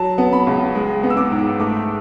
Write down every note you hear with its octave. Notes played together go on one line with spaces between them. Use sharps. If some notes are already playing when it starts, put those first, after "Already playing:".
Already playing: F#3 A5
B3
B5
C#2
G#3
B3
E6
D6
G#2
A3 D6